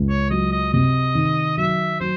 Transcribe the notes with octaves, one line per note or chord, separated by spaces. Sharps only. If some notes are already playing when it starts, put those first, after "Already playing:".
Already playing: C#2
C#5
F#3 D#5
D#5
C3 D#5
D#3
F#3 E5
F#3 C5